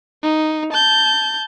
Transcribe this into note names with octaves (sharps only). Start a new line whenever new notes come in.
D#4
A5 G6